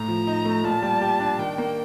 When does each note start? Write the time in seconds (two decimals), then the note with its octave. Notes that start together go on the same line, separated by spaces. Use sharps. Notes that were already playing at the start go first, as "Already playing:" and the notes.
Already playing: A2 A#5
0.08 F3
0.27 D#4
0.45 A3
0.64 A#2 A5
0.82 G3
1.01 G4
1.20 D4
1.39 D#3 G5
1.58 A#3